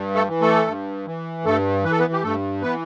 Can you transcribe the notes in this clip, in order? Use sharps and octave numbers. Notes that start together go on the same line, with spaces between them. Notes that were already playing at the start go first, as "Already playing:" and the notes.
Already playing: G2
A3 A4
E3
A3 A4
G2
E3
G2 A3 A4
E3 B4
A4
B3 B4
G4
G2 A3 A4
E3 B3 B4